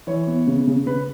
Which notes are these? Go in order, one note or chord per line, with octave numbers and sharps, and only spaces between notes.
E3 C#5
B3
C#3
C#3
C#3 B4